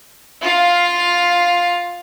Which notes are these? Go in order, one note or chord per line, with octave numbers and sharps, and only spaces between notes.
F4 F5